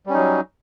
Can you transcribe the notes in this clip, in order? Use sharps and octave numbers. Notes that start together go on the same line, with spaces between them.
F#3 G3 C#4 D#4